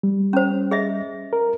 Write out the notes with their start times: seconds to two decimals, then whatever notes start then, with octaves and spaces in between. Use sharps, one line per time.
0.03 G3
0.33 C#4 C5
0.71 G#4 D#5 E5
1.33 A#4